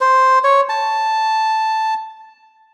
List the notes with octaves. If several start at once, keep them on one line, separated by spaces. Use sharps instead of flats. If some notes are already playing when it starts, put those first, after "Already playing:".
C5
C#5
A5